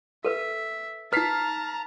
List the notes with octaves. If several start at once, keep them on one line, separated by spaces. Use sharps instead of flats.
A4 B4 E5
D#4 B4 A5 A#5 F6 B6 C7